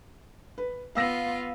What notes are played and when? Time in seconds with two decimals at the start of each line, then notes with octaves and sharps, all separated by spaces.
0.58 B4
0.95 B3 F4 F5 E6 A#6